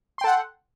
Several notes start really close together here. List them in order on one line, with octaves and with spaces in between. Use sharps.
C6 G5 A4 F#5